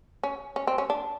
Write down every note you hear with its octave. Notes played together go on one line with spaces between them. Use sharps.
C#4
C#4
C4
C#4
D4